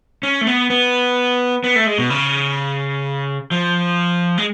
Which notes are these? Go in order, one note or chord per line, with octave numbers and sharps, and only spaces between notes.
C#4
A3
B3
B3
B3
A3
G#3
B2
C#3
F3
G#3